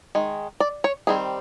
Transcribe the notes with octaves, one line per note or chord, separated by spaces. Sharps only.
D#3 G#3
D5
C#5
D#3 G3 C4 G#4